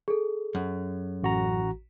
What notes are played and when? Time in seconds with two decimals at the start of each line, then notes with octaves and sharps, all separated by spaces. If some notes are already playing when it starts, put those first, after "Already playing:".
0.08 G#4 A4
0.55 F#2
1.23 A1 F#4 A#5